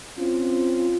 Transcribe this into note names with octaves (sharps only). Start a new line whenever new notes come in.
C4 C#4 F4